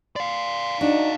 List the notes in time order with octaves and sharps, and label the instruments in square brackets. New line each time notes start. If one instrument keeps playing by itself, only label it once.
[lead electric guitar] D5 F5 [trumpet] C6
[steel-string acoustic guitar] D4 [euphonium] D#4 [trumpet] F#4